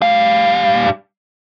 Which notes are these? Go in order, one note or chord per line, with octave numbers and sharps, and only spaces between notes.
G3 F5